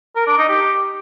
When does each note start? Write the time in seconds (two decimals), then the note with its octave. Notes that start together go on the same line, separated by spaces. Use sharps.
0.16 A#4
0.27 D4
0.38 D#4
0.49 G4